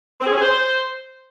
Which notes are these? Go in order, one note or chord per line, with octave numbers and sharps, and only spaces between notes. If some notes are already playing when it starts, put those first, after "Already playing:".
C4
G#4
C#4
G#4
C5